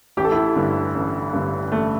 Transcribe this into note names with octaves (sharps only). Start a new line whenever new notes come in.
A1 G4
A4
E4 G4
G2 D3
A1
G2 D3
A1 A3